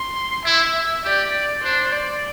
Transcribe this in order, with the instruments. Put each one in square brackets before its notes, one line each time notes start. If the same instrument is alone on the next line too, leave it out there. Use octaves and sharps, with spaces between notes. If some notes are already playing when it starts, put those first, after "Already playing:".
Already playing: [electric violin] C6
[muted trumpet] E4 [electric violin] E5
[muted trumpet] G4 [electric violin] D5
[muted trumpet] D4 [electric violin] C5
[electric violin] D5